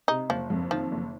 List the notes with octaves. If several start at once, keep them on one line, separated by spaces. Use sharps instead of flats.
C3 D#4
F#1 F3
F2
D#3 F3
F#1